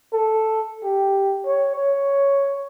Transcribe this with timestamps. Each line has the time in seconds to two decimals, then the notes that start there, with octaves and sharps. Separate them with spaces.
0.13 A4
0.84 G4
1.46 C#5
1.76 C#5